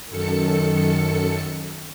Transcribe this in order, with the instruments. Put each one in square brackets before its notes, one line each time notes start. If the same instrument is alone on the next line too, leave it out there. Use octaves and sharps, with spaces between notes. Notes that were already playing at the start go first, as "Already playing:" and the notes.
[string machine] F#2 A4 C#7 [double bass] D#3